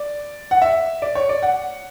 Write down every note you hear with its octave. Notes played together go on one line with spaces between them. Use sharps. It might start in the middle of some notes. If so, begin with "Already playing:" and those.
Already playing: D5
F#5
E5
D5
C#5
D5
F#5